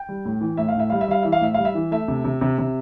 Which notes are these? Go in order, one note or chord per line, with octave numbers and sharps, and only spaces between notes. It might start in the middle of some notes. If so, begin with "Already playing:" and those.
Already playing: G5
G3
A2
E3
A2 E5
F5
A2 E5
G3 F5
E5
G3 F5
E3 E5
F5
A2 E5
G3 F5
E5
E3
A3 E5
C3
C3
C3
C3